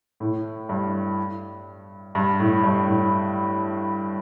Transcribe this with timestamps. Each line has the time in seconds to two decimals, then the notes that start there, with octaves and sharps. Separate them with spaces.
0.20 A2
0.69 G2
2.15 G2
2.40 A2
2.64 G2
2.88 A2